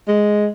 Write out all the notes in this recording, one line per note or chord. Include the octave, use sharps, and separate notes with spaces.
G#3